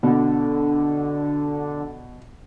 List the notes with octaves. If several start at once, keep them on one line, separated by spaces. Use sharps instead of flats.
B2 D3